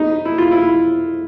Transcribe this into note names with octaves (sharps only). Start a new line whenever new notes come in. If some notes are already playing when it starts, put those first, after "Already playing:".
Already playing: D#4
E4
F4
E4